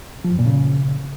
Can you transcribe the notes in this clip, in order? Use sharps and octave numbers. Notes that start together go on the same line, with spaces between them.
F3
F#2
A#2
C#3